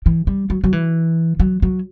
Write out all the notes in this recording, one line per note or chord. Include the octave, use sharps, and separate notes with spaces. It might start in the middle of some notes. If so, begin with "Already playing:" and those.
E3
G3
F#3
F#3
E3
F#3
F#3